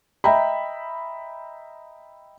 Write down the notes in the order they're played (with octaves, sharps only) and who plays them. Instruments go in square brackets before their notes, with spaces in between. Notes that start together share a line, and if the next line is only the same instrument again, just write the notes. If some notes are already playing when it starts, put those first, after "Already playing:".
[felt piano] D#5 E5 G5 A#5 B5